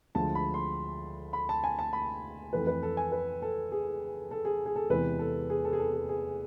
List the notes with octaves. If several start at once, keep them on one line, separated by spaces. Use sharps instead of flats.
D2 D3 F3 G#3 A5
B5
C6
B5
A5
G#5
A5
B5
F2 E3 A3 B4
B4
A4
G#5
B4
A4
G#4
A4
G#4
G#4
A4
E2 C3 E3 G#3 B4
A4
G#4
A4
G#4
A4
G#4
G#4